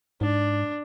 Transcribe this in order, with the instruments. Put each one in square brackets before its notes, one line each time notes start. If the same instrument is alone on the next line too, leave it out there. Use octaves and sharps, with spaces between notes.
[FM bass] G#2 [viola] D4